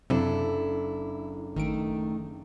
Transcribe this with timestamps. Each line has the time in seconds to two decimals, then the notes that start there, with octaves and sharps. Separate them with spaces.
0.10 F#1 C3 F#3 C4 D4 E4 A4
1.56 G#1 D#3 A3 D7